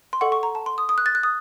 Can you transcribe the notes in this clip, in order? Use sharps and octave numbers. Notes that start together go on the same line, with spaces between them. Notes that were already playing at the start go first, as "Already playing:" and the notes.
C6
A4 D#5 F#5 C#6
C#6
A#5
A5
C6
D#6
D#6
F#6
A6
F#6
D#6